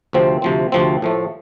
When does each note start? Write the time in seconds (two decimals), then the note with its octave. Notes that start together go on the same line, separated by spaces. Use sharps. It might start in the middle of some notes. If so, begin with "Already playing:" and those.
0.13 D2 C3 F3 C4
0.42 D2 C3 F3 C4
0.72 D2 C3 F3 C4
1.02 A2 F3 A3